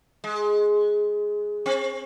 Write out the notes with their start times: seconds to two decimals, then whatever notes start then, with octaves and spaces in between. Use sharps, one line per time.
0.24 G#3
1.66 C4